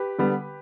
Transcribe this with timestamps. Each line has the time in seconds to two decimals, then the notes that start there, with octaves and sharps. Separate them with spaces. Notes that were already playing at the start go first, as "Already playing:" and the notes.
Already playing: G4 B4
0.19 D3 G3 B3